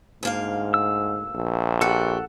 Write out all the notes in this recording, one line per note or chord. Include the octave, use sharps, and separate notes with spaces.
D2 G#2 A#3 F5
E6
A#1
F#4 G4 A4 F#5